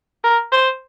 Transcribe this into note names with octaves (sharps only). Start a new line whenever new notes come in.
A#4
C5